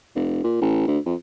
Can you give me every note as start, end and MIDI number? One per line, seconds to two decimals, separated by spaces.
0.15 0.43 29
0.44 0.57 46
0.61 0.84 33
0.87 0.99 38
1.05 1.15 41